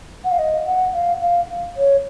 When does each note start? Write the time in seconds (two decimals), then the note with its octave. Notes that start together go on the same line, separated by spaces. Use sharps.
0.24 F#5
0.31 F5
0.39 D#5
0.66 F#5
0.94 F5
1.21 F5
1.77 C#5